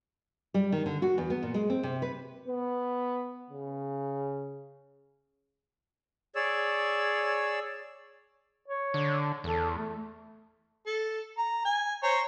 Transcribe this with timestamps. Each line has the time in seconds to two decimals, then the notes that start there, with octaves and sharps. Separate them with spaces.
0.54 G3
0.72 D#3
0.86 D3
1.02 F#4
1.18 E2
1.30 B3
1.42 A#2
1.54 G#3
1.70 C4
1.83 C3
2.02 B4
2.48 B3
3.50 C#3
6.35 G#4 C#5 D5 E6
8.68 C#5
8.94 D3
9.44 E2 A4
9.76 A3
10.86 A4
11.38 A#5
11.65 G#5
12.03 C5 C#5 A#5